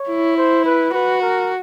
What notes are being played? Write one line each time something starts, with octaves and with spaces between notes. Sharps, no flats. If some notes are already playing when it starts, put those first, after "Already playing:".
Already playing: C#5
E4
C5
B4
F#4 B4
A#4